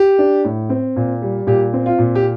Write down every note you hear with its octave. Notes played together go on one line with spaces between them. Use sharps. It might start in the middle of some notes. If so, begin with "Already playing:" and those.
Already playing: G4
D4
A2
C4
A#2
G3
A#2 G4
C4
F4
A#2
G4